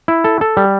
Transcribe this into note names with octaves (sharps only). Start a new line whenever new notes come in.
E4
A4
A4
G3